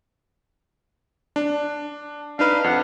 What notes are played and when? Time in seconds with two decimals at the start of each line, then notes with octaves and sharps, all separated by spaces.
1.36 D4
2.39 D4 D#4 B4 F5
2.64 F2 F#5